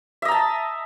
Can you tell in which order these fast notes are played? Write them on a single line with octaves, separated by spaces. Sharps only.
E5 D#5 A#5 A5